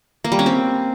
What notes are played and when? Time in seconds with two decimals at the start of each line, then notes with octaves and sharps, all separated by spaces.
0.24 A#3
0.32 G3
0.39 C#4
0.46 C4